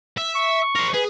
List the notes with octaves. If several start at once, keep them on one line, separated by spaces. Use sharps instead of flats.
E5
C#6
A#4 C5
G#4 B4